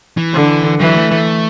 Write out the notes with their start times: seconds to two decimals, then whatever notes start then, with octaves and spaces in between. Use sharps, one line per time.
0.17 E3
0.33 D3
0.80 E3 F#3
0.96 A3
1.11 A3